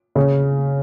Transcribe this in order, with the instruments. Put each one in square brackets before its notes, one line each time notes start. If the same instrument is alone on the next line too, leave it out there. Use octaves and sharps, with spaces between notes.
[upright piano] C#3